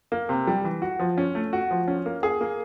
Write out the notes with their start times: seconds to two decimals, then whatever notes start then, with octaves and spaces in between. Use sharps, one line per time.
0.12 A#3
0.29 C3
0.47 G3
0.65 E3
0.82 F#4
1.00 F3
1.18 C#4
1.35 A3
1.53 F#4
1.71 F3
1.88 C#4
2.06 A#3
2.23 G#4
2.41 A#3